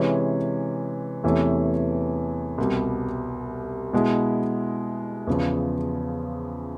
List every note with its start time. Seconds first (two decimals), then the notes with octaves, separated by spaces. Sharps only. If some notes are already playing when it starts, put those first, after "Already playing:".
Already playing: C3 E3 G#3 C#4
1.24 E2 C3 E3 A3 C#4
2.58 C2 B2 G3
3.93 B2 G#3 B3 E4
5.27 E2 C#3 F3